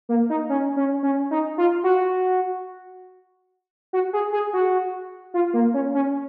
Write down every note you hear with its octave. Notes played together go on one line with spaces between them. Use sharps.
A#3
D#4
C#4
C#4
C#4
D#4
F4
F#4
F#4
G#4
G#4
F#4
F4
A#3
C#4
C#4